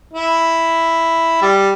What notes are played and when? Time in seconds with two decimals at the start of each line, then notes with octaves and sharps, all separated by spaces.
0.13 E4
1.42 G3